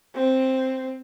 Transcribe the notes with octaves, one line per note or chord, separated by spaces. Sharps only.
C4